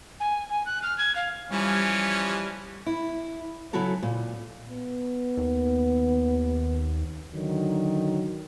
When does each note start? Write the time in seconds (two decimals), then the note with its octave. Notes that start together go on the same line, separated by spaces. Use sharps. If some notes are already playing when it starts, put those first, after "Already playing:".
0.20 G#5
0.49 G#5
0.66 F#6
0.83 F6
0.98 G#6
1.16 F5
1.51 E3 F3 G3 C#4
2.86 E4
3.73 C#3 F#3 E4 F#4 A4 A#5
4.03 A#2
4.69 B3
5.37 D#2
7.33 D3 D#3 F#3